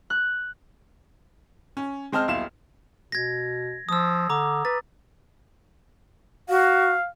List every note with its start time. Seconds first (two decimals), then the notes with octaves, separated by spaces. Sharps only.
0.10 F#6
1.77 C#4
2.12 G#3 C4 D#5 A5 F6
2.28 D#1 B1 E4 F5 C6 E7
3.12 B2 G#6 A#6
3.89 F3 D#6 E6
4.30 D3 A#5 D6
4.65 B4 A6
6.49 F#4 F5